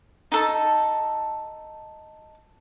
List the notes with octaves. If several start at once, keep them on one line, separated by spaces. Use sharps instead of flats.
D#4 A4 A5